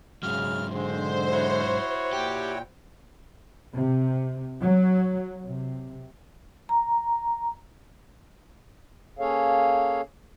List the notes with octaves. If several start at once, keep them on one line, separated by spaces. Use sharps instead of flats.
G#2 C#3 F#3 F6
D3 G#3 C5
E4 F#4 C#5
A#2 G4 G5
C3
F#3
C3
A#5
A#3 C#4 G#4 A4 C#5 F5